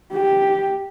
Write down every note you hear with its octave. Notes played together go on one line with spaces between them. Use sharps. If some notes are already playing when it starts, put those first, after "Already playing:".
G4